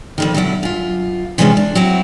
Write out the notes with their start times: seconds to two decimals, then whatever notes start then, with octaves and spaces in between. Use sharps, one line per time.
0.18 F2 D3 D#3
0.34 B2 D3 F#3 E4
0.63 F#2 F4
1.38 C3 E3 F3 G#3 C#4 D4
1.57 D4
1.75 F#3 C4 E4 F#4